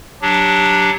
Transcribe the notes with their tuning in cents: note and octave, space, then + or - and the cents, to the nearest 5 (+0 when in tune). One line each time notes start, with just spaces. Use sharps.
F#3 +0 D4 +0 G4 +0